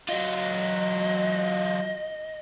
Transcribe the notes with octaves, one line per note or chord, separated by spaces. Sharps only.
F#3 F4 D#5